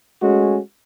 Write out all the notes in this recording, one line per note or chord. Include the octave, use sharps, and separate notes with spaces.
G#3 A3 C#4 F#4